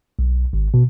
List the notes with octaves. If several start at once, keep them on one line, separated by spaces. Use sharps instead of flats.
B1
G#1
B2